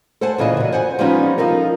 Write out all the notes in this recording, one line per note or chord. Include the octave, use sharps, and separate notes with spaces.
A4 C5 F#5 G#5 A5
A#2 C#3 E3 G#4 D#5
A#2 F#4
C5 F#5 G#5
F3 G3 G#3 B3 C#4 D#4
F3 D#4 A4 A#4